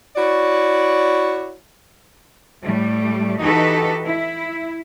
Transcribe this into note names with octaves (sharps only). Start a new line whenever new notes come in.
E4 F#4 C#5 D5
A2 G3 A3
E3 D#4 F#4 G4 A4 B4
E4